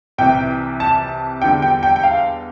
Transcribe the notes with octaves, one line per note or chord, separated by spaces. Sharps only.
C2 C3 E3 G5
A5
E2 D3 G3 G5
G5
G5
G5
F5